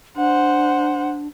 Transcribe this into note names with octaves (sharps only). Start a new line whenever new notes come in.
D4 C5 F#5